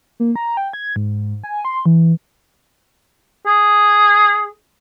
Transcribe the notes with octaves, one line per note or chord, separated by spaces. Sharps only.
A#3
A#5
G5
G#6
G#2
G#5
C6
E3
G#4